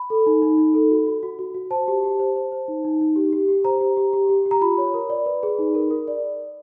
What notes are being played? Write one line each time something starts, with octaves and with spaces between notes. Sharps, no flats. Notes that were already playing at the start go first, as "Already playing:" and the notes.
Already playing: B5
A4
D#4
D#4
D#4
A4
F#4
F#4
F#4
F#4
F#4
C5 A5
G4
G4
C5
C5
C5
D#4
D#4
D#4
G4
G4
G4
C5 A#5
G4
G4
G4
G4
G4
A#5
F4 B5
C#5
A#4
D5
B4
G#4
D#4
A#4
A#4
D5